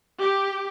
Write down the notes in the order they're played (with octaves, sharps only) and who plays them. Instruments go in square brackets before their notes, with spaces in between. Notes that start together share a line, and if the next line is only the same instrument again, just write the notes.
[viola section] G4